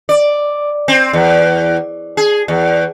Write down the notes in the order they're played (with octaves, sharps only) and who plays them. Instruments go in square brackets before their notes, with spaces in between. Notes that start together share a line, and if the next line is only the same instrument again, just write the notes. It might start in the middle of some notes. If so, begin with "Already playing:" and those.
[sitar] D5
C4
E2
G#4
E2